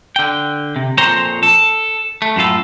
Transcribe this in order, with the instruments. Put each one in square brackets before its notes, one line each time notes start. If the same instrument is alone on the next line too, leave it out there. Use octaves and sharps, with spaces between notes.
[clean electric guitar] D3 G5
C3
F2 A#2 C5 C#5 A#5 C6
A4
A3
F#2 A2 F4 A4